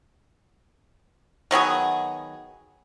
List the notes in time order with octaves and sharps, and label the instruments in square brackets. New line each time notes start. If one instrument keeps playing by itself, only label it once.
[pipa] D#3 F#3 B3 G#4